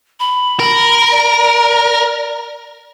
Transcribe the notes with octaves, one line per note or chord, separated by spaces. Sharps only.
B5
A#4
D5